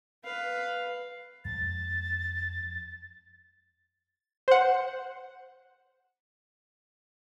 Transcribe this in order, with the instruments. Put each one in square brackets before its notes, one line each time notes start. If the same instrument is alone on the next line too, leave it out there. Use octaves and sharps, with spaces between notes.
[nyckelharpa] B4 F5
[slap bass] F2 G#3 [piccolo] A6
[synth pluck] C5 F#5